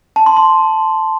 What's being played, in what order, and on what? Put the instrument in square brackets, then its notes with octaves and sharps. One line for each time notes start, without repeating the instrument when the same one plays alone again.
[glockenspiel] A5
C6
C6